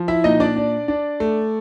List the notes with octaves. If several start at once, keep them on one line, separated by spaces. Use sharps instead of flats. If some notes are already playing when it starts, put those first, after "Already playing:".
Already playing: F3
E4 E5
A#2 D#4 D#5
D4 D5
D4
D4
A3